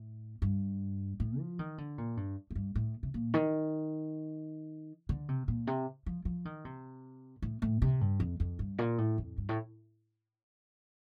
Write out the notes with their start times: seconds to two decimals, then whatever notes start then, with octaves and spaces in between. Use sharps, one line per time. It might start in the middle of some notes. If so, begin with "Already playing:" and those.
Already playing: A2
0.42 G2
1.20 A2
1.39 F3
1.59 D#3
1.78 D3
1.98 A#2
2.17 G2
2.51 A2
2.55 G2
2.75 A2
3.03 C3
3.14 A#2
3.34 D#3
5.09 D3
5.29 C3
5.48 A#2
5.67 C3
6.06 F3
6.25 F3
6.45 D#3
6.65 C3
7.42 A2
7.62 A2
7.82 C3
8.01 G2
8.20 F2
8.40 F2
8.59 G2
8.78 A#2
8.98 A2
9.18 F2
9.38 G2
9.49 A2